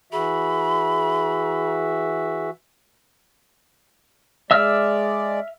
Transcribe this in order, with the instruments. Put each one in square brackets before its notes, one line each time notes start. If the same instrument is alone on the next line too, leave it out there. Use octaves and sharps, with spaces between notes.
[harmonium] E3 F#4 E5 [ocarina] G#4 [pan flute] B5
[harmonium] G#3 D5 [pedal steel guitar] E5 E6 F6